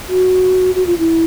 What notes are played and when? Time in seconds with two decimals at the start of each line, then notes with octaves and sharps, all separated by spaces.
0.09 F#4
0.75 F#4
0.86 F4
0.98 E4